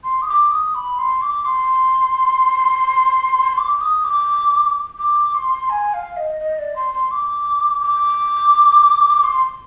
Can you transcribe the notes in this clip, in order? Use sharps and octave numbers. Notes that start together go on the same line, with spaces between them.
C6
D#6
D6
D#6
B5
C6
D6
C6
D6
D#6
D6
D6
C6
G#5
F5
D#5
D#5
D5
C6
C6
D6
D6
C6